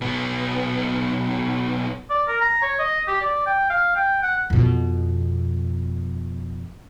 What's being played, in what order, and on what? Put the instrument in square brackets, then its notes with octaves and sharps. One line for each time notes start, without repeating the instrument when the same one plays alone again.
[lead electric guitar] B1 B3
[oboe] D5
A#4
A#5
C#5
D#5
G4
D5
G5
F5
G5
F#5
[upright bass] F2 B2